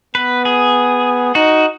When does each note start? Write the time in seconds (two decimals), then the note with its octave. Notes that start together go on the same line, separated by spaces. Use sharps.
0.15 B3 B4
0.45 G#4
1.35 D#4 F#4